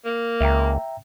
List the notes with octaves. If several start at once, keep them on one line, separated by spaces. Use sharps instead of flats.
A#3
C#2 E5 G5 A#5